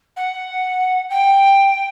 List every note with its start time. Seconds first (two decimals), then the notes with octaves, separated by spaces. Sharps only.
0.16 F#5
1.10 G5